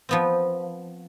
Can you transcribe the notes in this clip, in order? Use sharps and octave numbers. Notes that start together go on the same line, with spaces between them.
F3 B3 C4